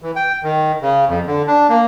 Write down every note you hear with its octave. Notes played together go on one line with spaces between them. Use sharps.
E3
G5
D#3
C#3
F2
D3
D4
A#3